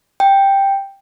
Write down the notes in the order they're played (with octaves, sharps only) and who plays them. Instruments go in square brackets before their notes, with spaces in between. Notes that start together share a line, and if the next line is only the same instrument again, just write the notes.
[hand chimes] G5